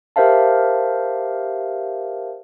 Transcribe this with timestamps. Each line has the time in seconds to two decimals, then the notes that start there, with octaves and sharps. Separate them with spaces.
0.16 G4 A#4 C5 E5 F5 A5